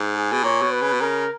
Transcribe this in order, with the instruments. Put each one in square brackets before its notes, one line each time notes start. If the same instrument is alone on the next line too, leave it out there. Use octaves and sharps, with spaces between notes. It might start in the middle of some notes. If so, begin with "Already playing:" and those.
Already playing: [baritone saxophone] G#2
[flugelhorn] G#4
[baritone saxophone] B2
[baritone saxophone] A#2 [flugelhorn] C#5
[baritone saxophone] B2
[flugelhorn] B4
[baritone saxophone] C#3
B2
[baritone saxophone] C#3 [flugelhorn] A#4